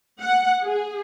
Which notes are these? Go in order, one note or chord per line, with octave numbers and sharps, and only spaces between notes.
F#5
G#4